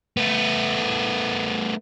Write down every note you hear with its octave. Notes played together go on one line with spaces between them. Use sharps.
A3 B3